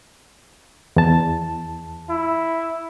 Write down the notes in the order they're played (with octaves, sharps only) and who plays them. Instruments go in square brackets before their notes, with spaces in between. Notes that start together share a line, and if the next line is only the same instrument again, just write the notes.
[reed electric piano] E2 A5
[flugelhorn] E4